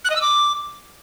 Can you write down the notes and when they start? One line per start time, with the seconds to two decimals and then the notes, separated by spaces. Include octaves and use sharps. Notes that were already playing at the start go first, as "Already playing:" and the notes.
0.04 F#6
0.10 D#5
0.15 E6
0.21 D6